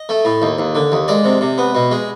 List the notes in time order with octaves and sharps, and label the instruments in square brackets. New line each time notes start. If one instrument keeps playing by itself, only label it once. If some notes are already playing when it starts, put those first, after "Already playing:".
Already playing: [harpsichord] D#5
A3
A2
D#2
D#2
D3
D#2
G#3 D5
C3
C3
B3
B2
G#3